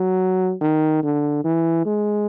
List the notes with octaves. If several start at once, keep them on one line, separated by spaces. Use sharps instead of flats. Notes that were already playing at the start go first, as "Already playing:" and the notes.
Already playing: F#3
D#3
D3
E3
G#3